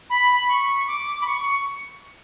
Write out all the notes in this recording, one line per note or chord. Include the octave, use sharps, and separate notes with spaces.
B5
C#6
D6
B5
C#6